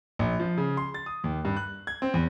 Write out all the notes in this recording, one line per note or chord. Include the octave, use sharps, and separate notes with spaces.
A#1
F3
C#3
C6
A6
D#6
D#2
G2
F#6
G#6
C4
E2